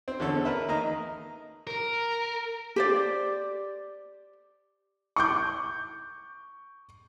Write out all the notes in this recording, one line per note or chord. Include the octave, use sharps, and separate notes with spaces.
C4
E2 D3 C#4 A4
A#4 B4 E5
D#3 A#3 D#5 A#5
A#4
G4 C5 D5
C#6 D6 G6